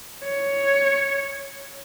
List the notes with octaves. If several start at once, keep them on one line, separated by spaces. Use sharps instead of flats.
C#5